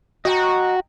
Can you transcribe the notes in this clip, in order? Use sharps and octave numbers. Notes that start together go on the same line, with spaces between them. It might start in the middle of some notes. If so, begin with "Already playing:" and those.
F#4 D#5 G5 A#5